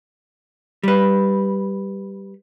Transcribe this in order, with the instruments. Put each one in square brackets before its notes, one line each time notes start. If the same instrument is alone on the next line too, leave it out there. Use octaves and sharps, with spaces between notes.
[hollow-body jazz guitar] G3 B4